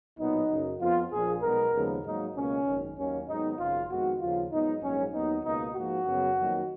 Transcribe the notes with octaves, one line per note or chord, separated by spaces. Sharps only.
B1 A#2 F#3 B3 D#4
F#2 C#3 F#3
F2 F3 B3 F4
A#1 A#2 F3 G#4
B1 B2 G#3 B3 A#4
D#2 C#3 F3 G#3 B3
G#2 F#3 A#3 D#4
C#2 B2 A#3 C#4
G#1 F#2 D#3
D#2 D#3 F#3 A#3 C#4
G#2 D#3 F#3 B3 D#4
G#1 F#2 C#3 F4
F2 D#3 G#3 B3 F#4
D#2 C#3 F3 A#3 F4
G#2 F#3 B3 D#4
A#1 G#2 F#3 A#3 C#4
D#2 D#3 F#3 B3 D#4
C#2 B2 A#3 D#4
G#2 F3 A#3 F#4
F#2 C#3 F#3 B3
F2 D#3 F#3 A#3